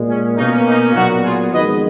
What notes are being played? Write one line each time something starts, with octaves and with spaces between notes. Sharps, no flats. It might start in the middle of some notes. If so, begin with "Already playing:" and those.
Already playing: A#2 G#3
C#4
B2 A#3 C#4 D#4
D#4
A#2 F#3 B3 D#4 F#4
F4 G#4
F2 D#3 G#3 B3 B4 D#5